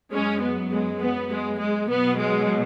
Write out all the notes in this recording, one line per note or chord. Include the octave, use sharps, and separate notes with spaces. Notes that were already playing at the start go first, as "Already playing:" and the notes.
F#2 F#3 G#3 C#4
B3
G#3
B3
G#3
G#3
B2 F#3 B3
G#3